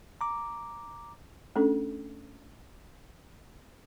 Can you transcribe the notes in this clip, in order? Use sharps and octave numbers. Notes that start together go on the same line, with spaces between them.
A#5 D6
A3 C#4 D4 A4